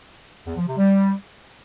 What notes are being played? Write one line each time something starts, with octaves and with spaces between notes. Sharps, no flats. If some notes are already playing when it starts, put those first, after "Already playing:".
E2
F3
C3
G3